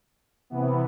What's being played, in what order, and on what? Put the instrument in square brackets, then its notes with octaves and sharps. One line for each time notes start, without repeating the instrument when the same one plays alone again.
[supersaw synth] C3 E3 B3